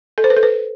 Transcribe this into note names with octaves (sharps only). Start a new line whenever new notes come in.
A4
C5
B4
A4
B4